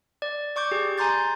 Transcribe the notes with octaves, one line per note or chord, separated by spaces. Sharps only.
D5
D5 C#6 D6 G6
G4 G#4
G#5 A#5 C6 G6 A6